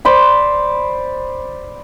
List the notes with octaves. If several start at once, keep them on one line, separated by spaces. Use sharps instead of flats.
C5 D5 B5